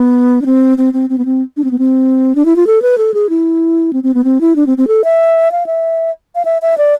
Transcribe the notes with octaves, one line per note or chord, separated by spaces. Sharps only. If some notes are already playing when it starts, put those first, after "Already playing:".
Already playing: B3
D4
C4
C4
C4
C4
B3
C4
D4
C4
B3
C4
D4
E4
F4
A4
B4
A4
G#4
E4
C4
C4
B3
C4
E4
D4
C4
C4
A4
E5
F5
E5
F5
E5
E5
D5